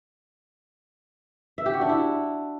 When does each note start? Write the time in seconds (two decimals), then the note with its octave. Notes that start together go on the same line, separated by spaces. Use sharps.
1.58 E5
1.66 G4
1.74 F#4
1.81 D4
1.89 E4